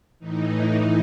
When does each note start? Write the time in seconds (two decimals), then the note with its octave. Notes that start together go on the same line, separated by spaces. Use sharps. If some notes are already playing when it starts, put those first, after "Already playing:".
0.19 A2 E3 D#4